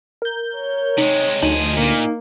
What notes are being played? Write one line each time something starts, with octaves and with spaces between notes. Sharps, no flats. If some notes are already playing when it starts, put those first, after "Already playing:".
A#4 G6
C#5
C3 G#3 D#4
D2 F3 D#4 G#4
A#2 A#3